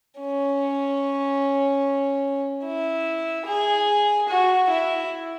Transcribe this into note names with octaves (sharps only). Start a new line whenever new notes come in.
C#4
E4
G#4
F#4
E4